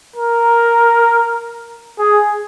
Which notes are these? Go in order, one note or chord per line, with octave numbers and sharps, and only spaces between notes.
A#4
G#4